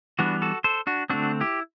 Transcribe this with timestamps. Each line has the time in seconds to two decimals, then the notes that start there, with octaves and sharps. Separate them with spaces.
0.19 E3 G3 B3 D4 F#4
0.42 F#4 A4
0.64 A4 C5
0.87 D4 F#4
1.10 D3 A3 C4 D4 F#4
1.40 E4 G4